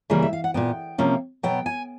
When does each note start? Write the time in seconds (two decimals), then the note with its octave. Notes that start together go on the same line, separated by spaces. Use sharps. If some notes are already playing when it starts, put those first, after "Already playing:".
0.10 C#3 E3 G3 A#3
0.22 E5
0.33 F5
0.44 F#5
0.54 A#2 F#3 B3 G5
0.98 C3 F3 A#3 C#4
1.43 B2 F#3 B3 G5
1.66 G#5